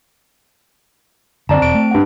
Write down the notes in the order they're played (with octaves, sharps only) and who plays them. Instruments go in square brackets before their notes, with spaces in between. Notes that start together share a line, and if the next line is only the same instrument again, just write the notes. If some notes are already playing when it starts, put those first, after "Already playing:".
[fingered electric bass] F#2 D3 [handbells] C4 A5 [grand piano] D5 A#5
[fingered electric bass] E1 [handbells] C4 D7
[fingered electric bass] A3
[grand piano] G2 F#5